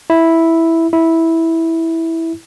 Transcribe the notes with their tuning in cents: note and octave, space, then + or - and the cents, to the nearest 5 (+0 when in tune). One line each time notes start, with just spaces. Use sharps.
E4 -5
E4 -10